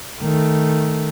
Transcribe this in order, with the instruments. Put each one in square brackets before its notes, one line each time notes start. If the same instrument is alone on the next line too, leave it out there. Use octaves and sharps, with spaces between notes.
[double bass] D#3 A3